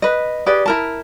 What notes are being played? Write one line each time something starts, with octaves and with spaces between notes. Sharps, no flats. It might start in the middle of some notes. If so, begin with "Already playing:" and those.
B4 D#5
G4 G#4 B4 D5
E4 A#4 A5